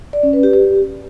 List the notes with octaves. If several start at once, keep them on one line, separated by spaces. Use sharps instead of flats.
D5
C#4
B4
G4
G4